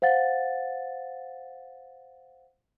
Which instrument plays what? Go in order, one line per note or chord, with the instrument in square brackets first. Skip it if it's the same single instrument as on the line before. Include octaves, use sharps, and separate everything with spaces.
[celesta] C5 F5 F#5 A6